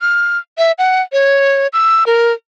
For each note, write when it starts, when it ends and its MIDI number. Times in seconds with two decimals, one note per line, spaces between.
0.01 0.38 89
0.58 0.72 76
0.78 1.01 78
1.13 1.67 73
1.73 2.04 88
2.07 2.33 70